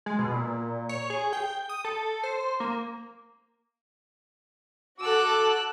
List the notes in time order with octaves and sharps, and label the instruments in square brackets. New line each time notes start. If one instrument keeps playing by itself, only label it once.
[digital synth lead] G#3
B2
A#2
C#5
G#4
G5
D#6
A4
C5
A#3
[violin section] F#4 A4 [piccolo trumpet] D6 [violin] E6 F#6